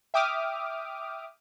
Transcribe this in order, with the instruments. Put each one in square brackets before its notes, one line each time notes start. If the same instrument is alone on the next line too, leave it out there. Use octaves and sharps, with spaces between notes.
[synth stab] E5 G5 D6 D#6 F6